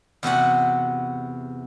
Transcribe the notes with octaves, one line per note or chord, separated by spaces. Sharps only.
E2 C3 F#4 F#5